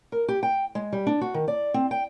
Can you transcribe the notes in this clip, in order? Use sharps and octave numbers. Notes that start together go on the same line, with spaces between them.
A#4
G4
G5
G#3
G3
D4
F#4
D#3
D5
C4
G5